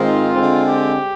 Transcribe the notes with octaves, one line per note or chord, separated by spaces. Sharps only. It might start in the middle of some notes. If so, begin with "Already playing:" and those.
Already playing: G#2 D#3 G#3 C4 F4
D3 G#3 C4
G4